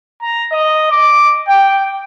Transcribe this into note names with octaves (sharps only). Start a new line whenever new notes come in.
A#5
D#5
D6
G5